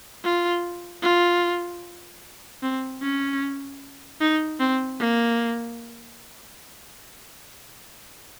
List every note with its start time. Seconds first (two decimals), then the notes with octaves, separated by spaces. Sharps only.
0.25 F4
1.03 F4
2.63 C4
3.02 C#4
4.21 D#4
4.60 C4
5.00 A#3